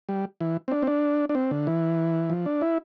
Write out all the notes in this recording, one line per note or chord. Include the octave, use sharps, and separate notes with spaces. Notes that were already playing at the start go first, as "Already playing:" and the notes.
G3
E3
C4
D4
C4
D4
D4
C4
D3
E3
F3
D4
E4